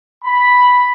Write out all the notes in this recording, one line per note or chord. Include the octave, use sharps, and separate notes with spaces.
B5